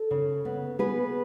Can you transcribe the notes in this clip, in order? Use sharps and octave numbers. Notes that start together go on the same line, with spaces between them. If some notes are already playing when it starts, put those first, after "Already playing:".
Already playing: A4
C#3
B3
B3 G#4 B4